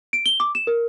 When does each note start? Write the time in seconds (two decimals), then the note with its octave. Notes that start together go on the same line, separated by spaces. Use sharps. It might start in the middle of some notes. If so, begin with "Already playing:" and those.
0.13 D7
0.26 G7
0.40 D6
0.55 E7
0.67 A#4